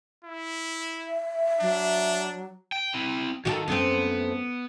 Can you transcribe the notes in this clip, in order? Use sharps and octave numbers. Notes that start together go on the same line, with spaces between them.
E4
E5
F#3 D4
G5
C4 E4
D#3 F#4 G4 A4
F#2 A3 B3 C4